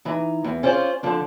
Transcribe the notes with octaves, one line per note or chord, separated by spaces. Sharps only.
E3 D#4
E2
C#4 F4 C5 D5
D3 F3 D4